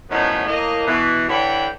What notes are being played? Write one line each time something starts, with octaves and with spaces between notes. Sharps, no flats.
F#2 A2 D#3 F3 B3 C#4
A2 A#3 D#5
B2 E3 E4
D3 E3 D4 C#5 G5 B5